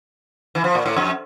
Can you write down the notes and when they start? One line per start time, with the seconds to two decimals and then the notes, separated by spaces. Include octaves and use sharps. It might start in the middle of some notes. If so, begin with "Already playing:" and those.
0.55 E3
0.64 F3
0.75 A#2
0.86 A2
0.96 F2